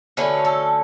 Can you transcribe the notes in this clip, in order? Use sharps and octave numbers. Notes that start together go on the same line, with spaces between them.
D3 F#3 A3 C#4 B4
A4